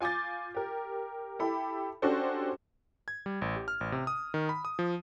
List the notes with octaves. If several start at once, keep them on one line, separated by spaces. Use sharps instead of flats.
F4 G#5 D6 G6 A6
G4 A#4
E4 G4 A4 B5
C#4 D4 F#4 G4 A4 C5
G#6
G3
A1
G4
F6
A1
C3
D#6
D#3
B5
D#6
F3